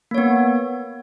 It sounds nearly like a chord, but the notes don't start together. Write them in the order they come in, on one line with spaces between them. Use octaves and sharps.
A#3 C#5 B3